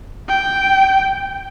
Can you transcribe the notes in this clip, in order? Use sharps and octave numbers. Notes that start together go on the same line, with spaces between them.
G5